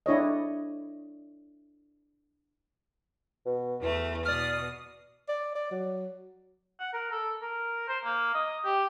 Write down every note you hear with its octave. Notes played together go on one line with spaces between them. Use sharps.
D4 E4 C#5 D#5
B2
E2 E3 A3
B2 D5 D#6 F6
D5
D5
F#3
F#5
A#4
A4
A#4
C5
A#3
D#5
G4